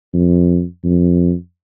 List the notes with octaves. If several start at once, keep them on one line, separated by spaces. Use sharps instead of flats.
F2
F2